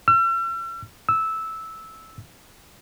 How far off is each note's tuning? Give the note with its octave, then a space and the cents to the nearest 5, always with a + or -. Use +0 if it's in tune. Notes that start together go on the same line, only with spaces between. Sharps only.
E6 +45
E6 -10